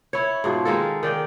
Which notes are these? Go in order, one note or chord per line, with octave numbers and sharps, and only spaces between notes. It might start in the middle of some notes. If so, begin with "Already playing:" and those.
E4 C#5
G#2 B2 F3
D#3 G#3 A#3 A4
D#3 D5 G5